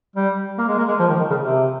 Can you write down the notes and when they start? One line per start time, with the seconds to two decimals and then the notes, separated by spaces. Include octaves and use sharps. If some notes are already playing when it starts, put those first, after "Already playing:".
0.16 G3
0.58 A#3
0.68 G#3
0.78 A#3
0.88 G#3
0.99 F3
1.09 D#3
1.20 D#3
1.30 C#3
1.40 C3